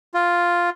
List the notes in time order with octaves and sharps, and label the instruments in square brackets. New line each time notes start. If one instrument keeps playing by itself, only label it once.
[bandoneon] F4